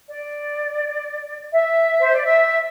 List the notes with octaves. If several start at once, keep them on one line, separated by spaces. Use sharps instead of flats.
D5
E5
C5
D5
E5